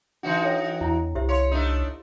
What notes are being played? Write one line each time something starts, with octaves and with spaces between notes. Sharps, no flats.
E3 D4 D#4 F#4
A4 C#5 G5
E2 E4 A#5
C2 G4 C5 E5
C#5 F5 C6
A3 D4 D#4